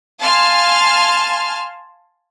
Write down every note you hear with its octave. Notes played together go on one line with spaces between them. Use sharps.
F5 G#5 A5 C6 F6